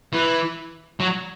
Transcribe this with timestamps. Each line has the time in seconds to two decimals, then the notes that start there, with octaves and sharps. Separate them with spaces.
0.13 E3
1.00 F#3